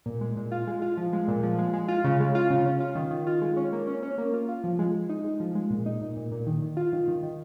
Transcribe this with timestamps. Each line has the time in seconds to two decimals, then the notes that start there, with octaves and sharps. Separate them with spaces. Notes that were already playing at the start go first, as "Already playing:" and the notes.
0.06 A#2
0.21 G#3
0.36 A#2
0.52 F4
0.67 G#3
0.82 F4
0.97 F3
1.13 G#3
1.28 A#2
1.43 F3
1.59 G#3
1.73 G#3
1.88 F4
2.04 C#3
2.20 G#3
2.35 F4
2.50 C#3
2.66 C#4
2.80 F4
2.95 D#3
3.11 D#3
3.27 F4
3.42 G#3
3.57 C#4
3.73 A#3
3.87 C#4
4.03 C#4
4.18 A#3
4.33 F4
4.49 F4
4.64 F3
4.79 G#3
4.94 G#3
5.09 D#4
5.24 G#3
5.40 F3
5.55 G#3
5.70 A#2
5.86 D#4
6.01 A#2
6.17 A#2
6.32 A#2
6.47 D#3
6.62 D#3
6.77 F4
6.93 D#3
7.08 D#3
7.23 D#3